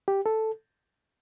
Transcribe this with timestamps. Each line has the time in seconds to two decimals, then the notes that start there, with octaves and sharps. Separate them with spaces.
0.08 G4
0.26 A4